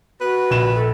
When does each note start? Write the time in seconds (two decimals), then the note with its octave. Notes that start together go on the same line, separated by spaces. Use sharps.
0.21 F#4 B4
0.51 A#1 E7
0.75 A4